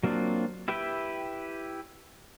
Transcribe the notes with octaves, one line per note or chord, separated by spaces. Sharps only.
F#3 A#3 C4 D4 F4
E4 G4 B4 E5 G5